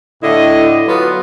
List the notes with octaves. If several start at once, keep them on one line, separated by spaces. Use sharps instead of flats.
A2 D3 E4 D#5
F#3 B3 F4